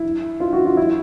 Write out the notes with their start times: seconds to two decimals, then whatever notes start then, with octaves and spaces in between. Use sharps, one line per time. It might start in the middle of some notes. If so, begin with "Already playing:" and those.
Already playing: E4
0.40 F4
0.53 F#4
0.65 F4
0.77 E4